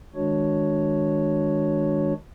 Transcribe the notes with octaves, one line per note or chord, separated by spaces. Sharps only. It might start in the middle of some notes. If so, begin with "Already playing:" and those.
D#3 G#3 D4 F#4 C#5